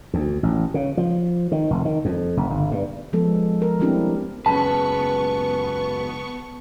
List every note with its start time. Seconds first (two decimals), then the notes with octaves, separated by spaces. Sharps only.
0.14 D2
0.43 A1
0.74 C#3
0.97 F3
1.52 D#3
1.70 F1
1.85 D#3
2.05 F2
2.37 F#1
2.50 G1
2.72 G2
3.13 F3 G#3 B3 A4
3.62 A#4
3.79 G3 B3 C4 D4 E4 G4
4.46 C#2 F#2 C#3 B3 B4 A5 C#6